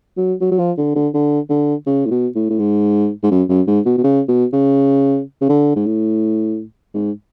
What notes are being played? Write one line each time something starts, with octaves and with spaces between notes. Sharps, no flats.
F#3
F#3
F#3
F3
D3
D3
D3
D3
C#3
A2
B2
A2
A2
G#2
G#2
F#2
F#2
G#2
B2
B2
C#3
B2
C#3
C#3
D3
G#2
A2
G#2